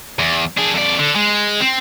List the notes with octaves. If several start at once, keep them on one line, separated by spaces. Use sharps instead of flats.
E2
D4 G#4
F2 D5
D3
G#3
C4